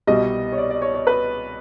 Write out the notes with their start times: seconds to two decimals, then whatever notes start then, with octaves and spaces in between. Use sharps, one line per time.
0.07 C2 B2 G3 D#5
0.52 C#5
0.58 D5
0.70 D5
0.82 C#5
0.95 C#5
1.07 B4